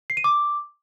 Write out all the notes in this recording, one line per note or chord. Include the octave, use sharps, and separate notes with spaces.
C7
D#7
D6